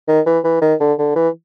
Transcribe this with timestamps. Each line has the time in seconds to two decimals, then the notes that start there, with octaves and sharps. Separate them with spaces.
0.08 D#3
0.26 E3
0.44 E3
0.62 D#3
0.80 D3
0.98 D3
1.16 E3